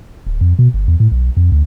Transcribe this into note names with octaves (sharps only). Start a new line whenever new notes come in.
D1
F2
B2
G1
E2
A2
B1
F2
D2